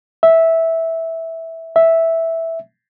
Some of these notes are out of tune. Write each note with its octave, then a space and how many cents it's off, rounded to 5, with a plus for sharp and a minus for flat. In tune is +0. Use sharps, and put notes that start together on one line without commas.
E5 -10
E5 -5